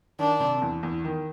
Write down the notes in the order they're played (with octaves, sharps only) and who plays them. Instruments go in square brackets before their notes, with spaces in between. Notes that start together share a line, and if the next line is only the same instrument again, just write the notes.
[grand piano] D#3 [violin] D4
[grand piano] C3
E2
E2
D#3